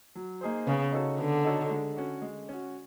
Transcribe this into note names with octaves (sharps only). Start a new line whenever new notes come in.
F#3
A#3 D#4 G#4 C5
C#3 B3
D#4 F#4 A4 C#5
D3 B3
D#4 F#4 A4 C#5
G#3
C#4 F#4
G#3
C#4 F#4